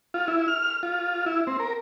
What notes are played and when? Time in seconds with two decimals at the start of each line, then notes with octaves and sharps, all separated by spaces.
0.14 F4
0.28 E4
0.48 F6
0.83 F4
1.26 E4
1.47 C4
1.60 A#4